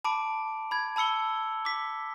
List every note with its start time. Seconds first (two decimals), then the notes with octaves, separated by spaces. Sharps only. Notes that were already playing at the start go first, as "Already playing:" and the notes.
0.04 A5 B5 D6 D7
0.71 B5 G#6
0.96 A5 B5 E6 C#7 G7
1.65 D6 B6